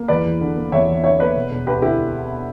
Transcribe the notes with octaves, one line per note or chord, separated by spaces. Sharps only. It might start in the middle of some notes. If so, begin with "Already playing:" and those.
Already playing: A#3
E2 B4 D5
E2
D3
A#3
E2 C#5 E5
E2
D3 C#5 E5
A#3 B4 D5
E1
E1
D2 G4 B4
D3 E4 G4